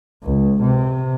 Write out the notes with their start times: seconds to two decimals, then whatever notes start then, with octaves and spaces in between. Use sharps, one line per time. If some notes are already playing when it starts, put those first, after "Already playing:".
0.24 C#2
0.61 C3